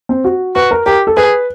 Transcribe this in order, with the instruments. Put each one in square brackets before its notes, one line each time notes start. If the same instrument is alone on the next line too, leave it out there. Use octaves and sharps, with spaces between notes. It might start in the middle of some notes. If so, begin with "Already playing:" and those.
[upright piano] C4
F#4
[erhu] F#4 [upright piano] B4
[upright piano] A#4
[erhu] G4 [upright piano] A#4
[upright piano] A4
[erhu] G#4 [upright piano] B4